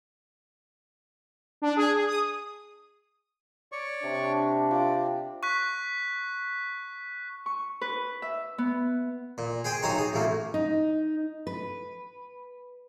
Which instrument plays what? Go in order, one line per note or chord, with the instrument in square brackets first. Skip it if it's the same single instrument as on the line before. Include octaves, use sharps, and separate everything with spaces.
[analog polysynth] D4
G#4
G#4
D#6
[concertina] C#5 D5 C#6
[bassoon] C3 [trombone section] D4
[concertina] C4 D5 [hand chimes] F4 F5 G5
[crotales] C#6 F#6 B6
[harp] C#6
B4
E5
B3
[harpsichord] A#2
G#4 C5 G5 G#5
B1 F#3 D#4 C5 A#5 C6
G#4
A1 F2 A3 A#3
[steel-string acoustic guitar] D#4
B4